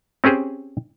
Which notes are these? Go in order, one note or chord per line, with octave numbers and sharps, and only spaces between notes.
C4 C#4 G4 G#4 C5